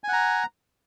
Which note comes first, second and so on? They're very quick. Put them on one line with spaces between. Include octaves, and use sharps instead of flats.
G#5 F#5 A#5